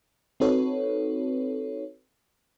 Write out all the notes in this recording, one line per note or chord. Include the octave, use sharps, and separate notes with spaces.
C4 D#4 F#4 A4 B4 C#5